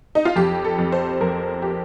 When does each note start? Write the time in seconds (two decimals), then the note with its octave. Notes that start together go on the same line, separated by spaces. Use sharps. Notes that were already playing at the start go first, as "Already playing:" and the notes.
0.15 D#4
0.25 F4
0.36 F2 G4
0.64 A4
0.78 F2
0.92 C5
1.20 F2 A#4
1.62 G4